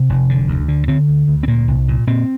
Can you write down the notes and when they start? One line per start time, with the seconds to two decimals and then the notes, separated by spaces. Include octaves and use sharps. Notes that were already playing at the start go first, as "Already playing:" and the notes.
Already playing: C3
0.10 F1
0.29 D3
0.48 D2
0.68 D3
0.88 D3 C4
1.08 D2
1.28 D2
1.43 C4
1.48 A#2 A#3
1.68 C2
1.88 A#2
2.07 A#2 C4